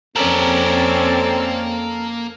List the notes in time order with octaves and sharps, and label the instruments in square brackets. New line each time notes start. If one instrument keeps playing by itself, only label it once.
[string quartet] F2 C#4 D5 [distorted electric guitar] A#3 B5 [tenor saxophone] C4 [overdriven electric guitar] A4 A#4